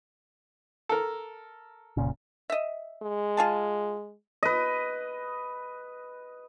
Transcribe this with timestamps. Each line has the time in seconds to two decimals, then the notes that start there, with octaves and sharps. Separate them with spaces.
0.89 A4 A#4
1.97 F1 A#2 C#3
2.50 D#5 E5
3.03 G#3
3.37 F4 G#4 A5
4.43 B4 D#5